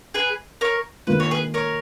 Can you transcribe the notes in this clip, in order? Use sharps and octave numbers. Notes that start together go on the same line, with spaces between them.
G#4 B4
A#4 C#5
D#3 A#3 F4 B4
C#5
G#4 B4
A#4 C#5